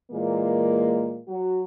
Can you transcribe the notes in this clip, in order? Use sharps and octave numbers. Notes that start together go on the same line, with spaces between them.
A#2 E3 G#3 A#3
F#3 F#4